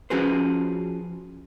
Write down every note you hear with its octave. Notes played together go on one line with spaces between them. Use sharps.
F3 C#4 F#4 G#4 B4 C5